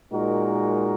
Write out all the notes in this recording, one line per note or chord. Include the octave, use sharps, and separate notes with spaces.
A#2 G#3 D#4 F#4 A#4